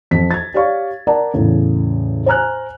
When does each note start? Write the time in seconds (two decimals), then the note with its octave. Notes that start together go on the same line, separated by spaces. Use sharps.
0.11 F2 B6
0.31 G#6 A6
0.54 G4 C#5 D5 F5 C#6
1.07 A#4 D5 F#5 A5 A#5
1.34 E2 A2 C#3
2.26 C5 G#5 A#5 F6 F#6